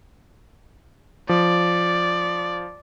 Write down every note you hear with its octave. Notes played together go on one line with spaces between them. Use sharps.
F3 D5